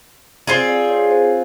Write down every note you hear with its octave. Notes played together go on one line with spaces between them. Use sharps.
C4 F4 G#4 D5
D5
C#5
C5